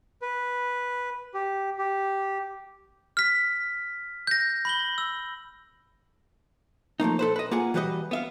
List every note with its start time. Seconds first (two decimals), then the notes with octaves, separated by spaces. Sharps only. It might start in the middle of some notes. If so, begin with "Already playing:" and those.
0.22 B4
1.34 G4
1.79 G4
3.17 F6 B6
4.27 G6 A#6
4.65 B5 F#7 G7
4.98 E6
7.00 F3 A3 A#3 D#4
7.19 A4 B4 C5
7.36 B4 D#5
7.51 A#3 F4 G#4 F#5 G#5
7.74 E3 G3 F#4 B4 D#5
8.11 B3 E5 F5